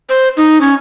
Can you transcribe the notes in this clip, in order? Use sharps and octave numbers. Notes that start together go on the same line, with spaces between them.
C5
D#4
C#4